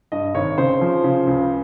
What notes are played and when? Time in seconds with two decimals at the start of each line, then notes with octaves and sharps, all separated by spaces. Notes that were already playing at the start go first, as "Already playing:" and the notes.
0.12 G2 D#5
0.34 G#1 C#5
0.58 C#3 C5
0.81 F3
1.04 C#3
1.27 C#2